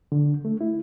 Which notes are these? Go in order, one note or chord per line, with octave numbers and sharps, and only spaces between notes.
D3
A3
E4